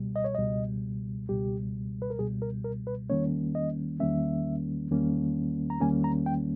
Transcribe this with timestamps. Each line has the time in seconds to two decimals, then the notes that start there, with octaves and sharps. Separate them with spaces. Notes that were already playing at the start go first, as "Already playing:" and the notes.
Already playing: C#2 B2 G3
0.16 D#5
0.24 C#5
0.35 C#2 B2 G3 D#5
1.29 C#2 B2 G3 G4
2.02 B4
2.10 A#4
2.19 C#2 B2 G3 G#4
2.42 A#4
2.64 A#4
2.87 B4
3.10 E2 D#3 G3 A#3 C#4 C#5
3.55 D#5
4.00 E2 D#3 G3 A#3 C#4 E5
4.91 E2 D#3 G3 A#3 C#4
5.70 A#5
5.80 E2 D#3 G3 A#3 C#4 G#5
6.04 A#5
6.26 G5